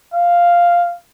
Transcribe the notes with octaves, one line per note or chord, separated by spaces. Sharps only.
F5